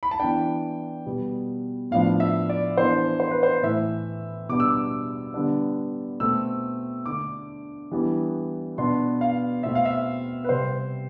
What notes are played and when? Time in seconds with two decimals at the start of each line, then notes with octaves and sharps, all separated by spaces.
0.03 B5
0.11 A5
0.20 E3 B3 D4 G5
1.06 B2 G3 B3
1.91 A2 F3 B3 D4 F5
2.20 E5
2.49 D5
2.77 E3 B3 D4 C5
3.20 C5
3.31 B4
3.43 C5
3.63 A2 E3 A3 E5
4.49 B2 G3 B3 D4 D6
4.60 E6
4.70 D6
5.34 D3 G3 B3 D4
6.20 B2 A3 C4 E6
7.06 D3 A3 D4 D6
7.91 E3 G3 B3 D4
8.78 B2 B3 D4 C6
9.21 F5
9.63 B2 A3 C4 E5
9.75 F5
9.85 E5
10.44 B4
10.49 C3 G3 C4 C5